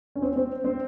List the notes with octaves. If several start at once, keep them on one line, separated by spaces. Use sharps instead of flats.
C#4
C4
C4
C4